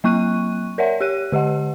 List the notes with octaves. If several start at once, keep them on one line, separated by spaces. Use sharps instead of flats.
F#3 A#3 C#6 F#6 D#7
A#4 C#5 D5 E5 F#5
G4 C#5 F#6 D#7
D3 G4 D#5 F#5